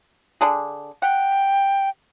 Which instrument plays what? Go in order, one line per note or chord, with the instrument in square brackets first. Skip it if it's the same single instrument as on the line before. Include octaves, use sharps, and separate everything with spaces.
[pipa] D3 D4 G#4
[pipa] F#5 [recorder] G5